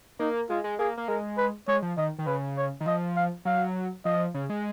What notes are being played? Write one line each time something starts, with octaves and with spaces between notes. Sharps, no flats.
A#3 D#4
G#3 F4
G#3
A#3 G#4
A#3
G#3 A#4
B4
G#3 C#5
F3
D#3 D#5
D#3
C#3 B4
C#5
D#3
F3 D#5
F5
F#3 F5
F3 D#5
C#3
G#3